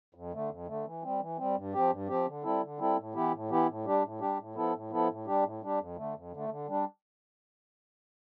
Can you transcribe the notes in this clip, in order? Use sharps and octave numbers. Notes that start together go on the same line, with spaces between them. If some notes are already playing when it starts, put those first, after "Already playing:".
F2
D3 A3
F2
D3 A3
E3
G3 C4
E3
G3 C4
G2
F3 C4 G4
G2
F3 C4 G4
D3
G3 C4 E4 A4
D3
G3 C4 E4 A4
A2
E3 B3 E4 G4
A2
E3 B3 E4 G4
A2
G3 D4 G4
A2
G3 D4 G4
A2
F3 B3 E4 A4
A2
F3 B3 E4 A4
A2
G3 D4 G4
A2
G3 D4 G4
F2
D3 A3
F2
D3 A3
D3
G3 D4